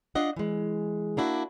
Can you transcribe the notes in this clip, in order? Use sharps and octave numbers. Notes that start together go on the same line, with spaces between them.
D4 F4 D#5 F#5
E3 G#3
A#3 D4 E4 F#4